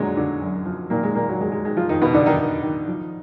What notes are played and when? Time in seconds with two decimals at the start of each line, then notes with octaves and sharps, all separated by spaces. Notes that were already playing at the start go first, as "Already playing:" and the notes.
Already playing: A#2 D3 F3 F#3 G#3
0.17 D3
0.42 F#2
0.65 F3
0.90 A#2 D#3 A#3
1.03 G#3
1.15 A#2 D#3 A#3
1.28 F#3
1.40 D#3 G#3
1.52 G#3
1.65 D#3 G#3
1.76 F3 F4
1.89 F2 D#3 D#4
2.01 B2 B3
2.14 D3 D#3 D4
2.26 D#3 D#4
2.39 D#3
2.63 D#3
2.88 F3